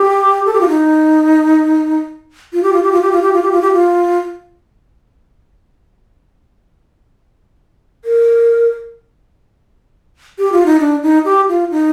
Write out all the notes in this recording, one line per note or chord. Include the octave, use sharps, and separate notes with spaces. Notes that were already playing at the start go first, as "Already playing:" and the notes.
Already playing: G4
A4
G4
F4
D#4
F4
G4
F4
G4
F4
G4
F4
G4
F4
G4
F4
G4
F4
A#4
G4
F4
D#4
D4
D#4
G4
F4
D#4